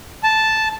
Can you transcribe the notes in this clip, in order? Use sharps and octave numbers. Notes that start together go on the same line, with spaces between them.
A5